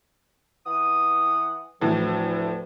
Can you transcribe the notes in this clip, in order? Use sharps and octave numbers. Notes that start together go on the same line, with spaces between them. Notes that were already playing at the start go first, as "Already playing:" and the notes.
E3 F#5 D#6
D2 A2 E3 F3